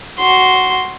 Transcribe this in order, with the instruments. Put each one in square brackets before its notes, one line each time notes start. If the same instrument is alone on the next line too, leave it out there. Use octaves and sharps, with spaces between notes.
[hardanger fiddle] F#4 C6